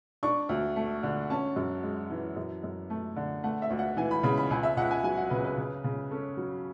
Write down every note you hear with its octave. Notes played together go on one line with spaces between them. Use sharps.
D4 C#6
D2
A3
D3
C#4 A5
F#2
G#3
E3
F#2
F#2
A3
D3
A3 F#5
E5
D2
F#5
E3 G#5
B5
C#3 B5
B5
C#2 G#5
E5
C#2 F#5
G#5
F#3 G#5
F#5
C#3 B4
B4
C#3
C#3
C#4 A4
F#3